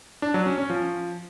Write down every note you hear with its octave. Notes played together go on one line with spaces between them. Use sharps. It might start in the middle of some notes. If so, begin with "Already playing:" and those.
D4
F#3
C#4
C#4
F3